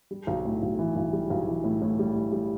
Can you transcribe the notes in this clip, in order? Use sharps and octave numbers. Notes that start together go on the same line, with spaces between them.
G3
B1
A2
B1
E3
B1
G3
B1
E3
A2
A2
G3
A2
G3